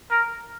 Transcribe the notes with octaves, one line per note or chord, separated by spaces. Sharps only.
A#4